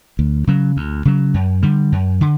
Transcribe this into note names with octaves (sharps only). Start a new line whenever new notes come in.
D2
C#3 F#3
D2
C#3 F#3
F#2
D3 G3
F#2
D3